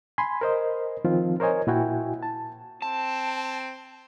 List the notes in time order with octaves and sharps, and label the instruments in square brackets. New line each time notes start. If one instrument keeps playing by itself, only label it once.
[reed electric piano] G#5 B5 C6
A#4 C5 D#5
D#3 F3 C4 F4
A#4 C5 C#5 D#5 G#5
A#2 E4 F#4 G5 G#5
A5
[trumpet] C4 [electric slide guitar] A5